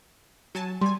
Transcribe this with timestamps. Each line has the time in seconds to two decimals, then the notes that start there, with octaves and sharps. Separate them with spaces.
0.55 F#3 G#5 A5
0.81 G3 G#5 C6